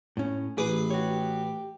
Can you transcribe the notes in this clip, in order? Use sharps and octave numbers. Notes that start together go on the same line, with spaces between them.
A2 C#4
A1 G#4 B4 D6
F#4 G4 C#5